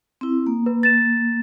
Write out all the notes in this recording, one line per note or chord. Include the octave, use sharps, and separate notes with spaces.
C4 E4
A#3
B4
A6 E7